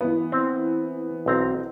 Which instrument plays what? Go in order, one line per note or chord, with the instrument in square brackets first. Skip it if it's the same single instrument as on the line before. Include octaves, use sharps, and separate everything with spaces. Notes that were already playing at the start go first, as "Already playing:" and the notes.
[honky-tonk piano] E3 B3
[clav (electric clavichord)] C4
B1 C4 A#5